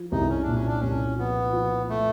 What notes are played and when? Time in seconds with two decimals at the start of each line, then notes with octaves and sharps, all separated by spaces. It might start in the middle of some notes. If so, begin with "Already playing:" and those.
Already playing: F3
0.12 C2 D#4
0.29 C#4
0.42 A#2 D4
0.54 C#4
0.68 D4
0.80 C2 C#4
1.17 F3 B3
1.53 F3
1.89 A3